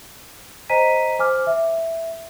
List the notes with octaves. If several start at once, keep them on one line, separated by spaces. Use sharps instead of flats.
C5 D#5 G#5 A#5 B6 D#7
C5 G#5 D6 F6
E5